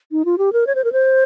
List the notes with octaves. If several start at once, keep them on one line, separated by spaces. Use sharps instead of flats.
D#4
F4
G4
A#4
C#5
C5
A#4
C5